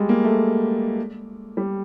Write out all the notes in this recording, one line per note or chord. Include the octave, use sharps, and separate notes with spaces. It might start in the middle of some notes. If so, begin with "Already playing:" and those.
Already playing: G3 G#3
A#3
A3
G3